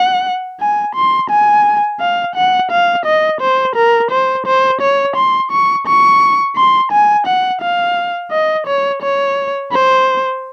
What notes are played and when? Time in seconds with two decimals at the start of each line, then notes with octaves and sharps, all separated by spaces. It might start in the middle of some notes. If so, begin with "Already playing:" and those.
Already playing: F#5
0.60 G#5
0.95 C6
1.30 G#5
2.00 F5
2.35 F#5
2.71 F5
3.05 D#5
3.41 C5
3.76 A#4
4.11 C5
4.46 C5
4.81 C#5
5.16 C6
5.51 C#6
5.87 C#6
6.56 C6
6.92 G#5
7.27 F#5
7.61 F5
8.32 D#5
8.67 C#5
9.02 C#5
9.72 C5